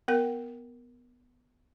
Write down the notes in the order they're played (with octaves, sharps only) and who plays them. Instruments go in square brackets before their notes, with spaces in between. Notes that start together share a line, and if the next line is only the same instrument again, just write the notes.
[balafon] B3 A#4 F#5